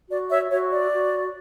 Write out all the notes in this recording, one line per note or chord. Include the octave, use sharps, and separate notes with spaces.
F#4 D5
C#5 E5
F#4 C#5 E5
D5
F#4